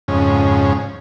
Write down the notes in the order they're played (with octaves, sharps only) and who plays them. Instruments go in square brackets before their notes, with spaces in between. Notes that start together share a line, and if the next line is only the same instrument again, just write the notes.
[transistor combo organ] F2 G#2 C#3 C#4